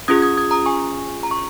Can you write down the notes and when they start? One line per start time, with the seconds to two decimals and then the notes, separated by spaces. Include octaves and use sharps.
0.08 C#4 F4 G#4 D#6 G#6
0.22 D#6 G#6
0.37 D#6 G#6
0.51 A#5 D#6
0.66 G#5 C#6
1.23 A#5
1.31 C#6